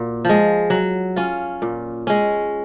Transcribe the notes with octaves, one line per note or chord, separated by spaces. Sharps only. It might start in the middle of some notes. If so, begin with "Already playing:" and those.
Already playing: A#2 F#4
F3 G#3
F#3
C#4 F4
A#2
G#3 C#4